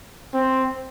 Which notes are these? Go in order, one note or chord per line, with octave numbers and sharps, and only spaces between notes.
C4